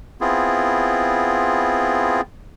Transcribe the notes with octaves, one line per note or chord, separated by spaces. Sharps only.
B3 C4 E4 F4 G#4